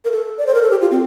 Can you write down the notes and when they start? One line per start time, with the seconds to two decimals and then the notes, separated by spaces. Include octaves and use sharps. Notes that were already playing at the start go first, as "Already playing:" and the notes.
0.05 A#4
0.12 A4
0.38 D5
0.47 C5
0.54 A#4
0.62 A4
0.71 G4
0.81 F4
0.91 C4